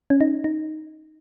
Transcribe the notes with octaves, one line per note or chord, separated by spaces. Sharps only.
C#4
D#4
D#4